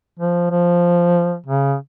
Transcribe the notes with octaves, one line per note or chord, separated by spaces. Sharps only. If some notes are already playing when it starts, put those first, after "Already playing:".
F3
F3
C#3